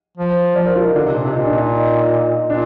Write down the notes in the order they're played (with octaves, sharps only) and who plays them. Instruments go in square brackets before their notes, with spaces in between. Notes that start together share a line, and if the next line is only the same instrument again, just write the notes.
[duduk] F3
[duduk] F3 [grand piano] D5
[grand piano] A#4
F4
D#4
[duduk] D3 [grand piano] D4
[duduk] C3
[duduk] A#2 [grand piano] D4
[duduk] C3
[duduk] A#2 [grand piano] D#4
[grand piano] D4
D#4
[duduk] A#2 [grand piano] D4